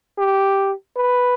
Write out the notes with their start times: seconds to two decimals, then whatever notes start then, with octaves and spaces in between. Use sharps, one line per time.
0.18 G4
0.96 B4